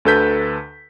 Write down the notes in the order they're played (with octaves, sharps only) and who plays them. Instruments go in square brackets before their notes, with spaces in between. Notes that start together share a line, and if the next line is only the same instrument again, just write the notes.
[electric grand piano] D2 D3 A4 B4 G6 B6